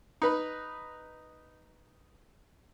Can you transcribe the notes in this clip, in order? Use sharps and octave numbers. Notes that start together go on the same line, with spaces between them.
D#4 B4 B5